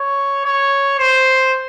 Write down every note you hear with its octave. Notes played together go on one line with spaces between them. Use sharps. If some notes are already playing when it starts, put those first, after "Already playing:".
Already playing: C#5
C#5
C5